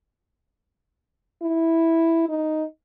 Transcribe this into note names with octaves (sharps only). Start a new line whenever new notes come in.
E4
D#4